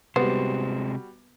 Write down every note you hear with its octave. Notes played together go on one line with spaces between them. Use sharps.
C3 G3 G#3 B3 F#4 C5